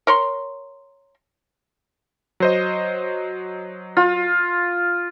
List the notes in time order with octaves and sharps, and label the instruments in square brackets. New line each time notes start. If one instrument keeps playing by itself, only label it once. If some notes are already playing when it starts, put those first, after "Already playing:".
[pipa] A#4 C#5 C6
[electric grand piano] F#3 C5 D#5
[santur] F4